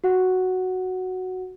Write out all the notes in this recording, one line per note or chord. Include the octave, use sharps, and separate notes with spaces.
F#4 F#5